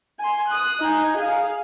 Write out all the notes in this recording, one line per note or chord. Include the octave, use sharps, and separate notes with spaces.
G#5 C6
D#6 F#6
D#4 G#5
G#4 F5